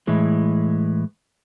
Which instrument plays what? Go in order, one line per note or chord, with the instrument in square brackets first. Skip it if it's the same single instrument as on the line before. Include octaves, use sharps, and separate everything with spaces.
[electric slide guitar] A2 E3 G#3